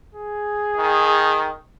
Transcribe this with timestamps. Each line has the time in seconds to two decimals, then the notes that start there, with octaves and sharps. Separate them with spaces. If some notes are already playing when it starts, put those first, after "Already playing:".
0.15 G#4
0.77 D#3